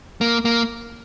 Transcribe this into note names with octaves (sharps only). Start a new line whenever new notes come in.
A#3
A#3